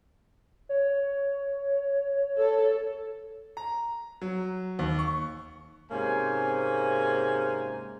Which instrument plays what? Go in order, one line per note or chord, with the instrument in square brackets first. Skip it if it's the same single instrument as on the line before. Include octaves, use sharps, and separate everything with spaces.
[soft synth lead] C#5
[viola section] A4
[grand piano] A#5
F#3
D#2
C#6
[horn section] G#2 C3 A#3 C#4 C5 G#5